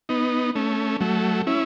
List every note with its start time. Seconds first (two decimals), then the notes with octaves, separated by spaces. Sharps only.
0.09 B3 D#4
0.55 A3 C#4
1.00 F#3 A3
1.47 C#4 E4